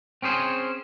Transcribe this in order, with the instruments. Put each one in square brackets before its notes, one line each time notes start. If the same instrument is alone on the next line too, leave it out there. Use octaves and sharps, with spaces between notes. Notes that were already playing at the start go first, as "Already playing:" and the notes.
[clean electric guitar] C4 C#4 G#4 C5